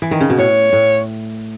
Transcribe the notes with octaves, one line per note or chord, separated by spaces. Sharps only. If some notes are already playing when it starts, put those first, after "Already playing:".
E3
D#3
C#3
B2
A2 C#5
A2